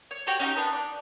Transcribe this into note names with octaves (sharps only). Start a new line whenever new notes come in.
C#5
F#4 G4 C#5 G5
C#4 D#4 F#4 G4
B3 D4
D5